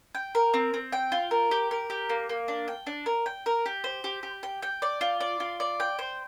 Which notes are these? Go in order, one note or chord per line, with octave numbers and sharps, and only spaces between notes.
G5
A#4
C4
C4
G5
F4
A#4
G4
A#4
G4
A#3
A#3
D4
G5
D4
A#4
G5
A#4
G4
C5
G4
G4
G5
G5
D5
F4
D5
F4
D5
G5
C5